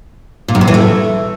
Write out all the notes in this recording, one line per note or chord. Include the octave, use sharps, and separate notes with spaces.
A#2
F#2
C3
E3
A3